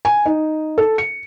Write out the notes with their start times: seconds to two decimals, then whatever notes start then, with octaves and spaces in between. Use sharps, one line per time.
0.05 G#5
0.26 D#4
0.78 A4
0.98 C#7